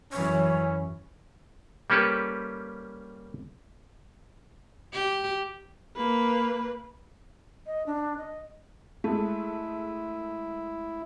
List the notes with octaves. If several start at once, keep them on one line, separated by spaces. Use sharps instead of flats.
F#2 E3 C#4 C#5
G3 A#3 C#4 G4 A4 B4
G4
A#3 B4
D#5
D4
D#5
G#3 A3 E4